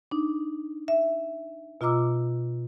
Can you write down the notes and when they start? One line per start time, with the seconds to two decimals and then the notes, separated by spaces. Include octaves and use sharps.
0.11 D4 D#4
0.88 E5
1.81 B2 F4 D#5 A#5 D6 E6